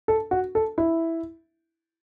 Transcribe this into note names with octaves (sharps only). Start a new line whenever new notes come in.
A4
F#4
A4
E4